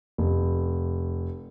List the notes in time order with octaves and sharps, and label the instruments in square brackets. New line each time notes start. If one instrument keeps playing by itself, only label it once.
[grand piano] F1